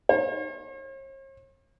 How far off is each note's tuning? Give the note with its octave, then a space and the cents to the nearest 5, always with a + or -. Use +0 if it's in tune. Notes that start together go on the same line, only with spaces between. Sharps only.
C#5 -45